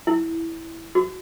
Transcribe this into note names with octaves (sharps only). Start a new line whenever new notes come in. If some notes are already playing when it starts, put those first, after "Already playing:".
E4
F#4